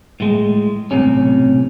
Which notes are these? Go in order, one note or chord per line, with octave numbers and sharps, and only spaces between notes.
A2 G#3
B1 F2 A2 C3 C#4